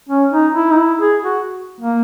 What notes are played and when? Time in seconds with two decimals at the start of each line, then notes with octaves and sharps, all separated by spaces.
0.09 C#4
0.32 D#4
0.55 E4
0.72 D#4
0.78 E4
1.01 G#4
1.23 F#4
1.81 A#3